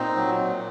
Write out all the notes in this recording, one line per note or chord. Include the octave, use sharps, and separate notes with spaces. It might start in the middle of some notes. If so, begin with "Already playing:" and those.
Already playing: A#2 C4 D#4
F#3
A#2